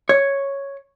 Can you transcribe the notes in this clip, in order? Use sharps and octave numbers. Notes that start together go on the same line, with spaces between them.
C#5